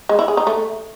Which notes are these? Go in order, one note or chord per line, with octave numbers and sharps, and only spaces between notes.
G#3
E4
G#4
D#4
A3